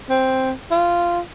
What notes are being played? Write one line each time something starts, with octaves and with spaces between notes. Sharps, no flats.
C4
F4